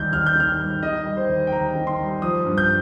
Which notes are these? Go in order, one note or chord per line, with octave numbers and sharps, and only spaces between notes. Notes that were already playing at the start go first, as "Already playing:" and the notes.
Already playing: D#2 D#3 G3 G6
D#2 F6
G6
D#3 F6
G3
D#3 D#5
G3
C5
D#2
G5
D#2 A#5
D#3
C6
G3
F3 D#6
G2
G6